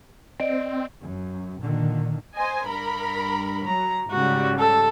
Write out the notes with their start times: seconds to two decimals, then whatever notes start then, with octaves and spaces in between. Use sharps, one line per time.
0.40 C4 D5 D#5 D7
1.01 F#2
1.60 A#2 D3 D#3
2.37 C5 D#5 G#5
2.67 G2 A#4 B5
3.67 F#3 A#5
4.11 G#2 C#3 G3 F#4
4.59 A4